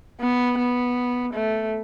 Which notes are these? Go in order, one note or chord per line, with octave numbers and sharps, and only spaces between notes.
B3
B3
A3